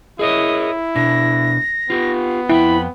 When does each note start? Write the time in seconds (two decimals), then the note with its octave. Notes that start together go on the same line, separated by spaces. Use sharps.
0.19 E4 G#4 A#4 C#5 D#5
0.96 B2 D4 A#6
1.90 B3 F4 G4
2.49 F2 F3 E4 G5 B5